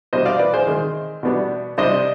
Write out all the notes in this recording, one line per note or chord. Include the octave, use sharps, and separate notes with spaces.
B2 G3 D4 C5 D#5
D5 F5
B4 D5
G#4 C5
D#3 G#3 C4
B2 G3 B3 D4
C3 G3 D4 C5 D#5